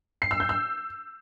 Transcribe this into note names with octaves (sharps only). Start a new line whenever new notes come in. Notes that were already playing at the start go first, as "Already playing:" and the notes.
C7
E6
G6
E6